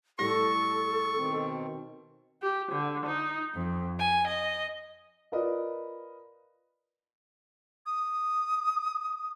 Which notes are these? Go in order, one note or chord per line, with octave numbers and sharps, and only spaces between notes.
A2 G3 A4 C#6 A#6
B2 D#3 C4
G4
D3
D#4
F2
G#5
D#5
F4 A#4 B4 D5 D#5
D#6